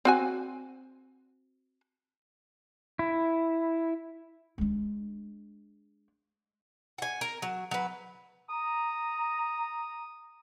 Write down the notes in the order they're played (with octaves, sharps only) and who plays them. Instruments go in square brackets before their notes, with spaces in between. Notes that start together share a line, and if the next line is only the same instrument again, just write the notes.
[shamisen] C4 F#4 G#5
[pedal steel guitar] E4
[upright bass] G#3 D4
[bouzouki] F#5 G#5
A#4
F#3
F#3 B4
[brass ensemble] A#5 [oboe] D#6